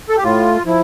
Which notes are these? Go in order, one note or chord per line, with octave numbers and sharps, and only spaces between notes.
A4
G4
A2 F4
F3 E4